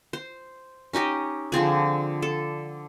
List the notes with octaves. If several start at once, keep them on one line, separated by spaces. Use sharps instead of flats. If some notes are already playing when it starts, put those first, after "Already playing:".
C5
C#4 D#4 G4 D#5
D3 F3 C4 G#4
A4